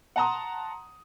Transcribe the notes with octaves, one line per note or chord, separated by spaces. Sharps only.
F#5 A5 A#5 C6 D#6